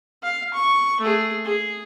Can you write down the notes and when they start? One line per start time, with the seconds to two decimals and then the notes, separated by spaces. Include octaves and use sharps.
0.23 F5
0.54 C#6
1.01 A3 G#4
1.45 G#4